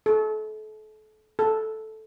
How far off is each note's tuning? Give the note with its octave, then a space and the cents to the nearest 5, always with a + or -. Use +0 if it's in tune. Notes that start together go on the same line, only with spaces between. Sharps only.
A4 -35
A4 -5